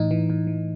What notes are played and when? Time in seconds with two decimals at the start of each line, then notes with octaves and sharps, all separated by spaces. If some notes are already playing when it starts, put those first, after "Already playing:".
Already playing: A2 E3 D#4
0.11 E3
0.30 A2
0.47 E3